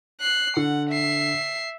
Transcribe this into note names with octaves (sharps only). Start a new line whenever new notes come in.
F#6 C7
D3 F#5
E5 C7